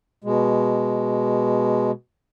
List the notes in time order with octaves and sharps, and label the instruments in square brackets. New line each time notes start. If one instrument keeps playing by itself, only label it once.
[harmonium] B2 G#3